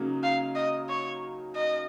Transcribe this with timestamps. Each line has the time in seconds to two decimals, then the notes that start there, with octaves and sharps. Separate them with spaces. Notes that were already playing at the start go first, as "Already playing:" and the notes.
Already playing: C#3 F#3 A#3 D#4
0.23 F5
0.55 D#5
0.89 C#5
1.56 D#5